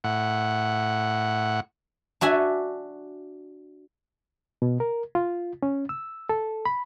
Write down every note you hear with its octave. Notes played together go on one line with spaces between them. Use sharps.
A2 F#5
D4 F#4 E5 G#5
B2
A#4
F4
C#4
E6
A4
B5